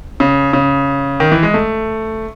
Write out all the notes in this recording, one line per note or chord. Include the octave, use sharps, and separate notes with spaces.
C#3
C#3
D#3
E3
G#3
A3